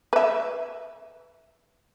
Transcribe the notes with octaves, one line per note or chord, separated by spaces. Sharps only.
B4 E5